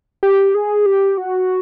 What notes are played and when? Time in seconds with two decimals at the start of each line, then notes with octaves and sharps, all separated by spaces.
0.23 G4
0.55 G#4
0.86 G4
1.17 F#4